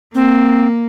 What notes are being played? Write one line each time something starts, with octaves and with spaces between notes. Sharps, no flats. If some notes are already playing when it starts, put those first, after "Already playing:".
A#3 C4